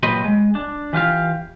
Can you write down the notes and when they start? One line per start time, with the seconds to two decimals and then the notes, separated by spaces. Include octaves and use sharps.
0.03 A#2 F#3 G4 B4 D#5 C6
0.24 G#3
0.55 D4
0.93 E3 F4 G4 F5